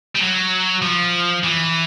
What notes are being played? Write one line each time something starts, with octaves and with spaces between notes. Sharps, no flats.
G3
F#3
F3
E3